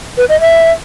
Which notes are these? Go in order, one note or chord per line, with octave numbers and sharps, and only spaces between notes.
B4
D#5
E5